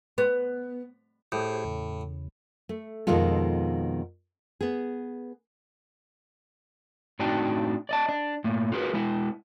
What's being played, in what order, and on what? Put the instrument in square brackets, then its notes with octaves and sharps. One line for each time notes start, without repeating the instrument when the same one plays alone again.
[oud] B3
[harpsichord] A2 [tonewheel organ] G4 G#4 C5
[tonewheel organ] E2 C#3
[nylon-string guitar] A3
F2 B2 D#3 G#3 F4 A4
B3 G#4
[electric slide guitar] A2 C4 D4 D#4 F#4 G5
D5 D#5 A5
D4
A2 A#3
F4 F#4 G#4 A#4 B4
G#3 B3 E4